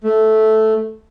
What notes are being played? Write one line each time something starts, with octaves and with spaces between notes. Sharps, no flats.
A3